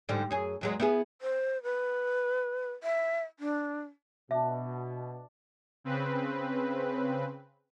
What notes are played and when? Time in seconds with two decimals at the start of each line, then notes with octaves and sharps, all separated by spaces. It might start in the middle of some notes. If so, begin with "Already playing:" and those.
0.09 G#2 D3 G3
0.31 F#2 G#4
0.61 E2 F#3 G#3
0.80 B3 E4 G#4
1.22 C5
1.63 B4
2.83 E5
3.40 D4
4.31 B2 D4 E5
5.84 C#3 C4 B4